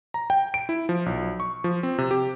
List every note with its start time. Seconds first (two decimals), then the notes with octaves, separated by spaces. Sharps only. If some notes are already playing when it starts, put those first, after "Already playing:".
0.14 A#5
0.30 G5
0.54 D7
0.69 E4
0.89 F3
1.06 B1
1.40 C#6
1.64 F3
1.83 C4
1.98 C3
2.11 G4